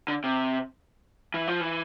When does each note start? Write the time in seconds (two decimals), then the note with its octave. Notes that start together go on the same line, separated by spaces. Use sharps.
0.08 D3
0.24 C3
1.34 E3
1.47 F3
1.61 E3